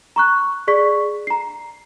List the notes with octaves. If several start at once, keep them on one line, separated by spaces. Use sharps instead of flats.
A#5 C#6 F#6
G#4 D5 C#6 B6
A#5 C7